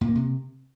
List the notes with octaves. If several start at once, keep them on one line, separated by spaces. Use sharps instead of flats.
A#2
A#3
C3